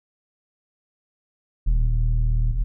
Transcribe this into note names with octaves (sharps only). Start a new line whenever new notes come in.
D#1